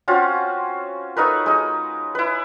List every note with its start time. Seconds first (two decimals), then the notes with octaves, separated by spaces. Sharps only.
0.08 C4 C#4 F4 F#4
1.16 A3 D#4 A#4 B4
1.46 G#3 D#4
2.15 E4 B4